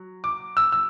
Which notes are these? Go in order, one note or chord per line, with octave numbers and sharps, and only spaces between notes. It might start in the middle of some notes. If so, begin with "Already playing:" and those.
Already playing: F#3
D6
E6
E6